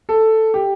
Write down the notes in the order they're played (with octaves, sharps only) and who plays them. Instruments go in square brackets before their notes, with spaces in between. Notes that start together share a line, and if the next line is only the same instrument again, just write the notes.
[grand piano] A4
G4